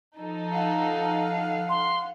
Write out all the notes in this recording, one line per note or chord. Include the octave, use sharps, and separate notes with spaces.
F3 D#4 A4
F5 F#5
C6